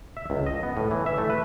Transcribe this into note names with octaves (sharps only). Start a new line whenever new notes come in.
E5
C#2
D#5
B3
A2
E3
E5
A3
B4